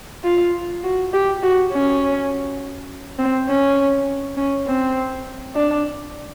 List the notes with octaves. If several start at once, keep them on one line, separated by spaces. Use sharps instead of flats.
F4
F#4
G4
F#4
C#4
C4
C#4
C#4
C4
D4